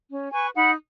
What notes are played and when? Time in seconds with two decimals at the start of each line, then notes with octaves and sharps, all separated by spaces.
0.10 C#4
0.32 B4 G#5 C#6
0.55 D#4 F#5 B5